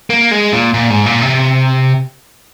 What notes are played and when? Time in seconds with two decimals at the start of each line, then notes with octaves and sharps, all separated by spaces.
0.10 A#3
0.31 G#3
0.52 A#2
0.74 A#2
0.90 G#2
1.06 A#2
1.22 C3